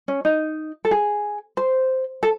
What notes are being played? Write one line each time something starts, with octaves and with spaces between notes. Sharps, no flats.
C#4
D#4
A4
G#4
C5
A4